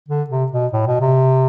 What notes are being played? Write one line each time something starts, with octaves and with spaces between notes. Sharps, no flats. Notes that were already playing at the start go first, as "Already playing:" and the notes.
D3
C3
B2
A2
B2
C3